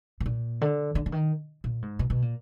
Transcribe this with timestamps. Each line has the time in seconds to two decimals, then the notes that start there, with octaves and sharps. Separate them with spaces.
0.20 B2
0.26 A#2
0.61 D3
0.95 D3
1.06 D3
1.12 D#3
1.64 A#2
1.82 G#2
1.99 B2
2.10 B2
2.22 A#2